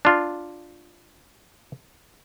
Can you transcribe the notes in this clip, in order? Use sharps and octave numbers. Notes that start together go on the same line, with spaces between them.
D4 F4